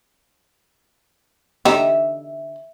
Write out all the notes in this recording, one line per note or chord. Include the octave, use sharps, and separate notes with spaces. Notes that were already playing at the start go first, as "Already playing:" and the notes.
D3 D#4 G4 E5